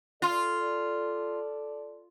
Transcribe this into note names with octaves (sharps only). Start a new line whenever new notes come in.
F4 A4 D5